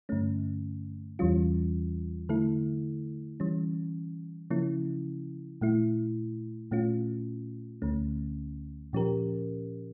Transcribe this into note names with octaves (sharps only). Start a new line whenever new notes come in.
G2 D3 A3 C#4
E2 E3 G3 C#4 F4
D3 A3 E4 A4
E3 G3 C#4
C#3 F3 A#3 C#4 E4
A#2 A3 E4
A#2 A3 C#4 F4
D2 D3 A3 C#4
A#2 F3 C#4 G4 A#4